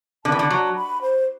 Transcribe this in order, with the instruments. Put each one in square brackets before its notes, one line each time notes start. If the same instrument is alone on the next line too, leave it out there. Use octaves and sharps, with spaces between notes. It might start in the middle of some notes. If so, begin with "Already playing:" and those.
[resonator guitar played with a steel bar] D3 [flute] A5
[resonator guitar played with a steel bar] E3
D3
F#3
[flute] B5
C5